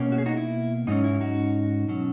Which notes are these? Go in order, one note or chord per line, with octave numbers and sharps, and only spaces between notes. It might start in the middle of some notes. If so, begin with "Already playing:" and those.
Already playing: B2 A#3 C#4
F#4
G#4
D#4 F#4
E4
G#2 F#3 C#4 D#4
E4
D#4 F#4
B2 F#3 C#4